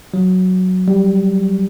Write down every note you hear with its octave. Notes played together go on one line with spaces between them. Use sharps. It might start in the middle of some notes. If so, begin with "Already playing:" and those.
F#3
G3